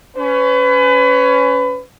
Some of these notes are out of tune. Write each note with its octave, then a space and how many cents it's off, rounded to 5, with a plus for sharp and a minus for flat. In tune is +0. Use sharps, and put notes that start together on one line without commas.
C#4 +15 B4 +30